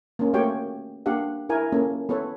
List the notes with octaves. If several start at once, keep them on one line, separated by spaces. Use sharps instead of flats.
A#3 C#4
A3 A#3 F#4 G4 C#5 G5
A#3 D4 G4 F5 F#5
E4 A#4 G#5
A#3 C#4 A4
B3 A4 B4 C#5